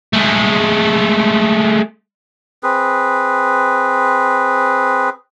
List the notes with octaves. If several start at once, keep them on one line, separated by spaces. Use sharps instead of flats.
G#3 A3
C4 G#4 B4